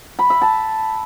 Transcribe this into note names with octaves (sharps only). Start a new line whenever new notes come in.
B5
E5
A5